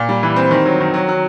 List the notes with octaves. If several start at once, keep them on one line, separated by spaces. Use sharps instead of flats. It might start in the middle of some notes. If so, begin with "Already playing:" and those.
Already playing: A#2
G3
E3
C4
D#3
F#3
D#3
F#3
F#3